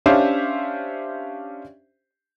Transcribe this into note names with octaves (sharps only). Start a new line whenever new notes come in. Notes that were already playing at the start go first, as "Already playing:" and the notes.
C#4 D4 G4 C5 E5 F5